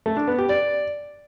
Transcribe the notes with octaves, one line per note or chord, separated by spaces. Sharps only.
A3
D4
B3
G4
D5